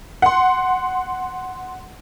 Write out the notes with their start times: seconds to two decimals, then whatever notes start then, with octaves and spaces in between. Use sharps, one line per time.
0.22 F#5 C6